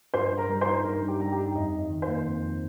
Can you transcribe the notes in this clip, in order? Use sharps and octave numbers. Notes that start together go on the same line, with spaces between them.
G2 C5 C6
G2
A#4 A#5
G3
C5 C6
D#4
G2 A#4 A#5
G2
G4 G5
G3 A#5
G4 G5
D#4
F2 D#5
F2
D#5
D#3
C5
A#3
F2
F2